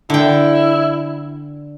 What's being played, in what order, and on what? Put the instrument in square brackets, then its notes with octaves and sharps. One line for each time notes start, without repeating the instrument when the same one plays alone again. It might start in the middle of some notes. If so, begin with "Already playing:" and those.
[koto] D3 G5 [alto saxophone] E4